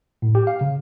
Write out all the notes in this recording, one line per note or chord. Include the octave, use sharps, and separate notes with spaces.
A2
G4
F5
C#3